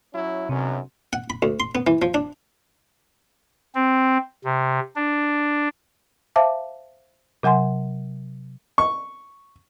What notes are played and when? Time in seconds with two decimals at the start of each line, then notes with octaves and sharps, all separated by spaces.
0.14 F#3 C#4 E4
0.49 B1 F#2 C3
1.13 F#5
1.30 B5
1.42 D2
1.60 C6
1.75 B3
1.87 E3
2.02 F3
2.14 D4
3.75 C4
4.45 C3
4.96 D4
6.36 C5 E5 F5 A5 D6
7.43 C3 F#3 F#5 G#5 C6
8.78 C#6